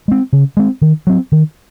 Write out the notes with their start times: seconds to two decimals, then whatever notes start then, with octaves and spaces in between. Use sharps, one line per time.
0.08 G#3 C4
0.33 C#3
0.57 G#3 C4
0.81 D#3
1.07 F#3 C4
1.32 D#3